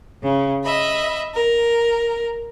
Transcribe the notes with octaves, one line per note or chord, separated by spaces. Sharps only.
C#3
D#5 E5 B5
A#4